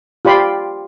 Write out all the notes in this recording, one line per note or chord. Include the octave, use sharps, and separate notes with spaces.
F4 G4 D5 B5 C6